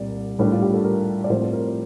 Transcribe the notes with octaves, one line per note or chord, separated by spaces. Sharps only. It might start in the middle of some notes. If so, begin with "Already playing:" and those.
Already playing: C2 A#2 G3 C4 D5
A2 G3 D4
F4
G4
A4
A#4
D5
A2 F3 C4 C5
A#4